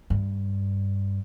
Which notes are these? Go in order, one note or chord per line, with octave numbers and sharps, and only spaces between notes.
G2